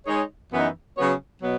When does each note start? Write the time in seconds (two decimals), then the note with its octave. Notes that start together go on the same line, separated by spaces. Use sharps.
0.06 G#3 D#4 G#4 C#5
0.51 F#2 E3 B3 D#4
0.97 C#3 F#3 B3 F#4 C#5
1.43 B2 F#3 B3